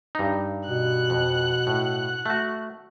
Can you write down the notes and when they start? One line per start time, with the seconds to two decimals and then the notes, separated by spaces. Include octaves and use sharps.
0.15 G2 D#4
0.69 B2 F#5 F#6
1.10 F2
1.67 A2
2.26 A3 F#4